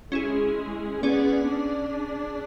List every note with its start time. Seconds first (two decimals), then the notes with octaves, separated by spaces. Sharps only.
0.12 G#3 C#4 E4 G#4
1.03 B3 C#4 G#4 D5
1.49 D4